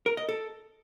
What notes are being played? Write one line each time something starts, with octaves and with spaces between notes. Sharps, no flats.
A#4
D#5
A4